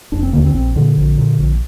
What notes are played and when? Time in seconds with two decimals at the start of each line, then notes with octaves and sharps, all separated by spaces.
0.12 F1 D4
0.23 C4
0.33 D#2 D3 A#3
0.44 C4
0.54 A#1 C4
0.76 A#2 D3
0.97 A#1
1.18 A#2
1.39 A#1